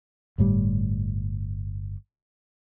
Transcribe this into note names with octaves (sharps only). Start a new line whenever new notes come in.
G1 A2 G3